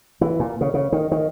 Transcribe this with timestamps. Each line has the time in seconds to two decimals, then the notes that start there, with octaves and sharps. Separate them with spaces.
0.21 E3
0.40 A#2
0.61 C#3
0.74 C#3
0.92 D#3
1.11 D#3